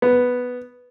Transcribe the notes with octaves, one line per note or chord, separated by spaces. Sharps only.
B3